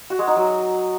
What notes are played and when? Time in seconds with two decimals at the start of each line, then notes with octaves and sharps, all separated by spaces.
0.10 F#4
0.19 G#3
0.27 D#4
0.36 F#3